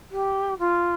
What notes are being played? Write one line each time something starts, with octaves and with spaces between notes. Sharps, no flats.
G4
F4